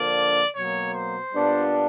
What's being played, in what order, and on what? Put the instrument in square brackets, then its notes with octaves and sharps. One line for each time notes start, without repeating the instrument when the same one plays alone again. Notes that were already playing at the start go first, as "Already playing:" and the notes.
Already playing: [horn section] D3 F3 A#3 D4 [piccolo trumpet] D5
[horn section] B2 F#3 A#3 [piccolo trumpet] C#5
[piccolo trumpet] C5
[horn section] A#2 G3 B3 D4 F4